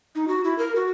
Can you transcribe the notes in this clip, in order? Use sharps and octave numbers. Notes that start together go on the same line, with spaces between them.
D#4
F#4
E4
A#4
F#4